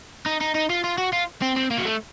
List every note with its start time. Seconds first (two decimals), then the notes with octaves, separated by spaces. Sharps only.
0.26 D#4
0.41 D#4
0.54 D#4
0.70 F4
0.84 F4
0.98 F#4
1.13 F4
1.42 C4
1.56 C4
1.71 A#3
1.78 F#3
1.85 A3